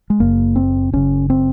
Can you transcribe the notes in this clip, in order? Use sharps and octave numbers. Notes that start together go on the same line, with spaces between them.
G#3
F#1 F#2 C#3 A#3
C4
F#1 F#2 C#3 C#4
C4